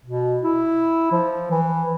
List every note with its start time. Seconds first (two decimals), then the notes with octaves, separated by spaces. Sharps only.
0.05 B2
0.43 E4
1.12 F3
1.51 E3